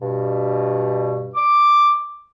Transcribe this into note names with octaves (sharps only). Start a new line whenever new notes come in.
G2 B2
D6